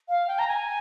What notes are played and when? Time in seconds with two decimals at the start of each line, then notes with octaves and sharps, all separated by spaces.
0.08 F5
0.28 G5
0.39 A#5
0.47 G#5